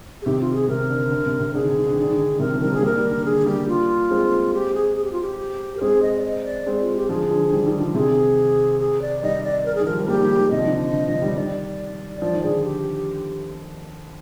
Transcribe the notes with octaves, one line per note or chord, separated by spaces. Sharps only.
G#4
C3 D#3 G4
F4
G4
G#4
C3 A#4
D3
D3
C3
C3
D3 G#4
D#3
D3
D#3
D3
D#3
D3
D#3
D3
D3
C3 D#3 A#4
F3
D#3 G3 A#4
G#3 G#4
G3 A#3 A#4
D#3 G3
D3
D3 G#4
G3 A#3 G4
F4
G#3 C4
G4
G#4
G#4
G4
F4
G4
A#4
G#3 C4 G#4
D#5
D5
D#5
D5
G#3 C4
F4
G4
D3 F3 G#4
D3 F3
D#3 G3
D#3 G3
D3 F3
C3 D#3 G#4
G#4
D5
D#3 G3 D#5
D5
A#4
G#4
D#3
F3 A#4
G3
G#3
G3 A#3 G4
D#3 G3
D#3 G3
C3 D#3 D#5
F3
D#3
D3
D3
D3 F3
D#3 G3
D#3 G3 D5
F3 D5
D#3
D3 F3 G#4
G4